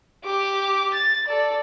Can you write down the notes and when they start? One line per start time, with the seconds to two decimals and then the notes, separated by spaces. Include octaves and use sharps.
0.25 G4 D6
0.94 A6
1.28 A4 D5